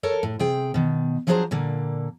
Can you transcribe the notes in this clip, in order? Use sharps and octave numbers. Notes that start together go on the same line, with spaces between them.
A4 A#4 C#5 A5
A2
C3 G#4 G5
B2 D#3
F3 F#3 D4 G#4 C5 A#5
A#2 D3 A#3